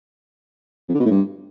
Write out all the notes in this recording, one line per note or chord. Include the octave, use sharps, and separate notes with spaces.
F2
D3
B2
A2
G2